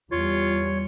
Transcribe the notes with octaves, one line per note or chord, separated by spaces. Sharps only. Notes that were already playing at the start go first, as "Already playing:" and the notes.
E2 G3 F4 C#5